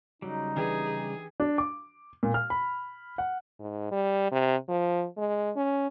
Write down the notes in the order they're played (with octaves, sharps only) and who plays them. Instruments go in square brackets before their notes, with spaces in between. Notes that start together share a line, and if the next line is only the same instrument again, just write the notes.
[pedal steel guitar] C#3 G3 [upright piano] F#3 [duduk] D#4
[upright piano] E3 D4 G4 [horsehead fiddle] G#4
[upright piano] D4
D6
A#2
F6
B5
F#5
[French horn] G#2
G3
C3
F3
G#3
C#4